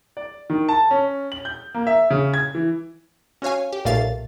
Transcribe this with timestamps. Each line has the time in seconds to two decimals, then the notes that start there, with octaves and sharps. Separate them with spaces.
0.17 D5
0.50 D#3
0.69 A5
0.91 C#4
1.32 F#7
1.45 G6
1.74 A#3
1.87 E5
2.10 C#3
2.34 G#6
2.55 E3
3.42 C#4 F#4 C#5 F5 G#5
3.73 G4
3.85 B1 A#2 A3 A#3 F5 A6